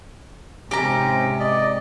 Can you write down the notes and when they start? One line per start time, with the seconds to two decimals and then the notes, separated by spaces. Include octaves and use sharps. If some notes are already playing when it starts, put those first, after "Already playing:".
0.71 G#2 C3 C#4 G4 A#5
1.40 D5 D#5